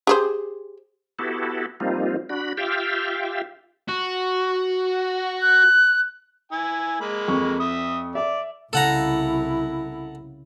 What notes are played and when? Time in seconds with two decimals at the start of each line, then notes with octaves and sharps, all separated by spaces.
0.07 G4 G#4 C5
1.19 B3 E4 F#4 G4 A4
1.80 F3 G3 A#3 C4 D#4 F4
2.29 D4 F#4 B5
2.57 F4 G4 E5 F5 G5
3.89 F#4
5.42 F#6
6.52 E4 G#5
7.01 G#3 A#3 B5
7.28 F2 C#6
7.60 E5 D#6
8.15 D5 E5
8.73 C2 C#3 E4 A4 F5 F#5 A#5 G6